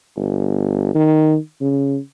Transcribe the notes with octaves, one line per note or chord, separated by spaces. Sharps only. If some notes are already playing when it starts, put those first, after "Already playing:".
G1
D#3
C#3